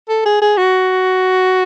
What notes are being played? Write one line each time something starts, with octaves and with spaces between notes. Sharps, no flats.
A4
G#4
G#4
F#4